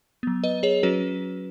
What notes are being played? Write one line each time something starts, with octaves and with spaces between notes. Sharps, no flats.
F#3 B3
B4 D#5
G#4 C#5
F#3 C#4 F#4 B4